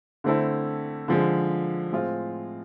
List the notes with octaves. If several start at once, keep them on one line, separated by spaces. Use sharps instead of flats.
D3 A3 C4 E4 A4
D3 F3 G#3
A2 G#3 C4 F4